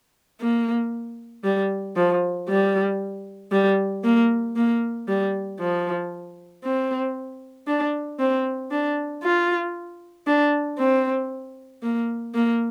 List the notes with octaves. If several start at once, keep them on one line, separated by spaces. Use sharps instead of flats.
A#3
G3
F3
G3
G3
A#3
A#3
G3
F3
C4
D4
C4
D4
F4
D4
C4
A#3
A#3